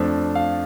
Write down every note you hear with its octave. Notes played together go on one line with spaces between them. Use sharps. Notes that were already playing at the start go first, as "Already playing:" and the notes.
Already playing: F2 F3 A3 D4
F5